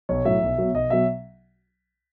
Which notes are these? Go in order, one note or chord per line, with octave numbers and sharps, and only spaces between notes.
B1 C#5
A2 F#3 E5
B1
B2 F#3
B1 D#5
B2 F#3 E5